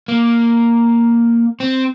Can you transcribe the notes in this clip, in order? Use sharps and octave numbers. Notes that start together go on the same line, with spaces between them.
A#3
C4